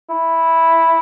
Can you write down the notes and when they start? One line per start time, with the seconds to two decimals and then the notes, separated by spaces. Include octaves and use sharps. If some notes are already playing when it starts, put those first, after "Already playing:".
0.11 E4